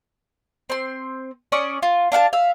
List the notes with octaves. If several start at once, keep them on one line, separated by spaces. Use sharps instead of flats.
C4 C6
C#4 D5 C#6 D#6
F4
D4 F5 F#5 A5
E5 F5